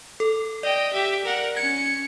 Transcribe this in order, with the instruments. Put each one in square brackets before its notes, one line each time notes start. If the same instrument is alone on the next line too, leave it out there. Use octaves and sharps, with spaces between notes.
[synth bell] A4
[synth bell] D5 [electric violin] D#5 G5
[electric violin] G4 E5
A#4 F#5
[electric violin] C#4 C#7 [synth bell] G#6